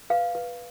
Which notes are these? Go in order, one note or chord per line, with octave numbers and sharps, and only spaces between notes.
B4 F5
B4